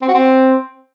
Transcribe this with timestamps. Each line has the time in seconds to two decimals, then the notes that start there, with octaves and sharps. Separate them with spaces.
0.02 C4
0.08 F#4
0.14 C4